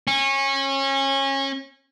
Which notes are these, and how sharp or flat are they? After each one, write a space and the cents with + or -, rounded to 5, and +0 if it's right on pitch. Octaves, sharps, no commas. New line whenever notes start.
C#4 -25